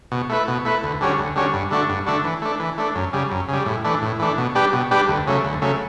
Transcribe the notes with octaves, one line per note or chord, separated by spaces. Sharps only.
B2
A3 E4 B4
B2
A3 E4 B4
D2
D3 G3 C#4 F#4
D2
D3 G3 C#4 F#4
G2
D3 A3 D4 F#4
G2
D3 A3 D4 F#4
E3
A3 D4
E3
A3 D4
F#2
C#3 G3
F#2
C#3 G3
A2
E3 A3 D4
A2
E3 A3 D4
B2
G3 D4 G4 B4
B2
G3 D4 G4 B4
D2
C#3 F#3 A3
D2
C#3 F#3 A3